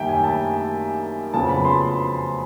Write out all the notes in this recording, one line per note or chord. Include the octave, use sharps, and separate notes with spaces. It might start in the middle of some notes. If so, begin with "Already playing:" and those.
Already playing: F#2 D#3 G3 A#3 E5 G5
G#5
A5
F2 C#3 F#3 B3 A5
B5
C6